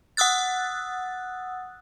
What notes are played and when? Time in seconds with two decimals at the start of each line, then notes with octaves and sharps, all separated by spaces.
0.17 F#5 D#6 E6 F#6 A6